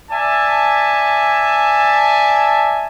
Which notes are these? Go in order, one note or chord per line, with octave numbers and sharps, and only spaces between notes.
D5 E5 G#5 A5